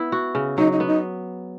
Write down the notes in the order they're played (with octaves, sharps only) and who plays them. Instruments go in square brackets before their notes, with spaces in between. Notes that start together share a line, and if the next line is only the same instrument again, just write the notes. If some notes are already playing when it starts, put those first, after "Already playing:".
Already playing: [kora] B3 E4
F#4
C#3
[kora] F#3 [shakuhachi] D#4
[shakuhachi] D#4
[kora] B3
[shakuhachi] D#4